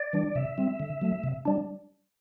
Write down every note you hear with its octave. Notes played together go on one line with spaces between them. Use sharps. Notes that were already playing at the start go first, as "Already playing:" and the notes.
Already playing: D5
E3 G3 D4
C3 E5
G3 C4
D3
F#3 A3
C3
G3 D4